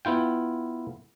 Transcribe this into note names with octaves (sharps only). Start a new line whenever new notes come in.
B3 E4 F4 G5